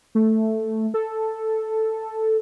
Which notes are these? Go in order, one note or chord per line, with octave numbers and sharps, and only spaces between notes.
A3
A4